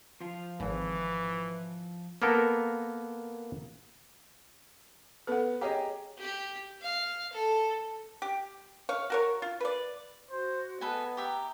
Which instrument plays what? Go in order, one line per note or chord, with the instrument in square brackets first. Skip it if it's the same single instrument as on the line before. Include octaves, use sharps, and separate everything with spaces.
[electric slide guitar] F3 F4
[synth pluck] G#1 [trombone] E3
[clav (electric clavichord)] A#3 B3 A4 A#4
[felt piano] B3 [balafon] A4 F#5
[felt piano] G4 G#4 D#5 [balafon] C#5 A#5
[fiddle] G4
F5
A4
[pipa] G4
C#5 F5
F#4 A#4 C#5
F4
B4 D5
[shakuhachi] F#4 [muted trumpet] C5
[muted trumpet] B3 [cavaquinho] A4 B4 G#5 [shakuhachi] D#5
[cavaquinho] G4 E5 [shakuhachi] A#5